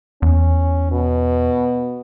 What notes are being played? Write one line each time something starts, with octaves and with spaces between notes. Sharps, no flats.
E2 C#4
B2